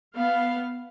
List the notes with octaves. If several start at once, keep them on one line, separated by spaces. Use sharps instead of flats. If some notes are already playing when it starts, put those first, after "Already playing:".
B3 F5